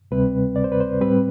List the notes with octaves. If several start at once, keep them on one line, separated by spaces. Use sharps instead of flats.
D2 C3 G3 C4 B4
D5
C5
B4
C5
A2 G3 C4 B4